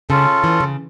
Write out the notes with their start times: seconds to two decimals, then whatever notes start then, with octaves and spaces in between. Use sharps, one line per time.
0.10 C#3 C#4 F4 A4
0.44 E3
0.60 C#3